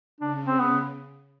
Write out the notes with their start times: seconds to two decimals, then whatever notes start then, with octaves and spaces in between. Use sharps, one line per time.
0.20 C#3 D4
0.46 C4
0.60 B3